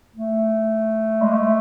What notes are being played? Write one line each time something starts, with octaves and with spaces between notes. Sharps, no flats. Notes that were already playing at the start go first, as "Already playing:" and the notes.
A3
G#3
A3